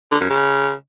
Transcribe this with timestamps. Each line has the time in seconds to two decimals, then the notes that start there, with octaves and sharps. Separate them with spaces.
0.12 D3
0.21 F#2
0.30 C#3